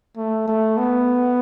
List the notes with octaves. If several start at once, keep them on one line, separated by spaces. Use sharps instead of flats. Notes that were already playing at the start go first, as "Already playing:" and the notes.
A3
A3
B3